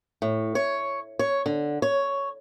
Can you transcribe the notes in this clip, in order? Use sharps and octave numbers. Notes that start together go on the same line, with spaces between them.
A2
C#5
C#5
D3
C#5